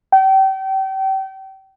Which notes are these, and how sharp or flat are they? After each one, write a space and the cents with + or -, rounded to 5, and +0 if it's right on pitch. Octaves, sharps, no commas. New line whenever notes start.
G5 -35